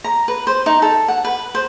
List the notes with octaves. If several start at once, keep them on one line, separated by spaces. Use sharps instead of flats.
A#5
B4
C5
D#4
A4
F#5
B4
C5